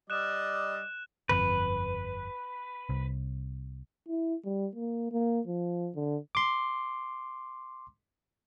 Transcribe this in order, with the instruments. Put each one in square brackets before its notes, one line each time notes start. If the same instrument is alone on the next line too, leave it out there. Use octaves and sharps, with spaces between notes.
[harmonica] G3 D5 D#5 [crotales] F#6 E7
[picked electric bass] G1 F2 [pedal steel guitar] B4
[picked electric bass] C2
[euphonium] E4
G3
A#3
A#3
F3
D3
[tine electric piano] C6 D6